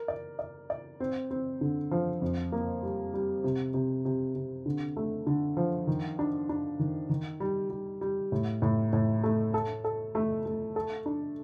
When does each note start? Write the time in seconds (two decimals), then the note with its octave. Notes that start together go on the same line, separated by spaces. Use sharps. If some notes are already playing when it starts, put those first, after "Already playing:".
Already playing: A#4
0.08 D5
0.39 D5
0.70 D5
1.00 C4
1.31 C4
1.61 D3
1.91 F3
2.22 F2
2.52 A#3
2.83 G3
3.13 G3
3.44 C3
3.74 C3
4.05 C3
4.35 C3
4.66 D3
4.96 A3
5.27 D3
5.57 F3
5.87 D#3
6.19 D4
6.49 D4
6.79 D#3
7.10 D#3
7.40 G3
7.70 G3
8.01 G3
8.32 A2
8.62 A2
8.93 A2
9.23 A3
9.54 A4
9.84 A4
10.15 A3
10.46 A3
10.76 A4
11.06 D4